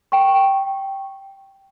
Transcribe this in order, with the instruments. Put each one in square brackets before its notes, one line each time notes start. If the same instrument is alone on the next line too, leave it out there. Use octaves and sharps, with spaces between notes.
[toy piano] G5 C#6